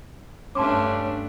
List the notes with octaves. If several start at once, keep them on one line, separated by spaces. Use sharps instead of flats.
G2 A3 C#4 D4 A5 C6 D6